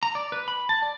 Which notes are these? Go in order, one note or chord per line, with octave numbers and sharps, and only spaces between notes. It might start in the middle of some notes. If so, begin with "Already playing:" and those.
A#5
D5
B4
B5
A5
D5